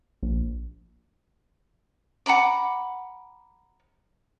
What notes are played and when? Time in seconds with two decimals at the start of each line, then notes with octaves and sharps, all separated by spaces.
0.23 A#1
2.26 F#5 A#5 B5 D6